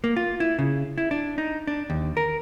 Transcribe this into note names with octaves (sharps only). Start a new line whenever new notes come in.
A#3
F4
E4
C#3
E4
D4
D#4
D4
D#2
A#4